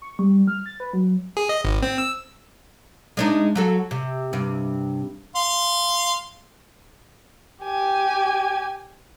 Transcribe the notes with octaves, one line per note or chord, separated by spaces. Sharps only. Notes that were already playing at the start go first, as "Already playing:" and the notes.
C#6
G3
F6
A6
B4
F#3
G#4
D#5
G#1
C4
E6
G#3 D4 D#4
F#3 F#4 A4
C3
G2 C3
F5 C6
G4 G#5